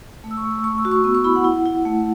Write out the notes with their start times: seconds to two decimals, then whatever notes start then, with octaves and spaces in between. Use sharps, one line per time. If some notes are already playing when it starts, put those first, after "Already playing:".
0.24 A3
0.31 E6
0.37 C#6
0.44 A3
0.51 E6
0.64 A3 C#6
0.78 E6
0.85 F#4
0.92 C#6
1.04 B3 E6
1.15 C#6
1.24 E4 B5
1.35 F#5
1.44 E4
1.66 E4
1.85 A3